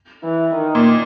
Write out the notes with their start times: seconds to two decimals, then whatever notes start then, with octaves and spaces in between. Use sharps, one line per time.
0.24 E3
0.54 D#3
0.75 A#2